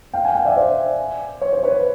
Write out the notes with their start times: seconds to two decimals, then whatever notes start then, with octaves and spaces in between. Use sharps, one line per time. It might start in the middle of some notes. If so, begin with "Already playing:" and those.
0.14 F5 G5
0.24 F#5 G#5
0.35 F5 G5
0.45 D5 E5
0.57 C5 D5
1.41 C#5
1.53 C5
1.63 B4 C#5